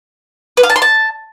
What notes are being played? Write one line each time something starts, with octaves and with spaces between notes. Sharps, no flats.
B4
F5
A5
C6
A5